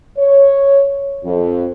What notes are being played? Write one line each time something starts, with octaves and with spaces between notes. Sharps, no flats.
C#5
F2